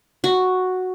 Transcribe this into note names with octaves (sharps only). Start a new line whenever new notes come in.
F#4